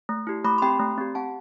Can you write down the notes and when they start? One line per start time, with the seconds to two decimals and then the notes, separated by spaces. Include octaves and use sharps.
0.09 A3
0.27 E4 G4
0.45 A3 B5 D6
0.58 C6
0.62 C4 G4 G5 B5
0.80 A3
0.98 C4 G4
1.15 C4 F#5 A5